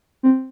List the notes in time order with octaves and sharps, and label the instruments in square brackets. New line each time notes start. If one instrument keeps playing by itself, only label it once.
[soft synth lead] C4